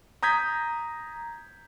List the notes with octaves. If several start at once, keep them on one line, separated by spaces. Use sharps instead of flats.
A#5 D#6 G6 G#6 B6